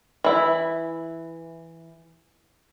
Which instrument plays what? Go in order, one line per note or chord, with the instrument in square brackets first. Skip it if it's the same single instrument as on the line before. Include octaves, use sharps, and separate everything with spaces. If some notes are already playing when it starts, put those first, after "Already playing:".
[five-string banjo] E3 E4